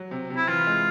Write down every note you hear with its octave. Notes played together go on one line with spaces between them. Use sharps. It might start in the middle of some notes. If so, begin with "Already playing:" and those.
Already playing: F#3
C3
C3
E4
E3 F4
G#3